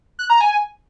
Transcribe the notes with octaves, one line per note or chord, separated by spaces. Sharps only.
F#6
A#5
G#5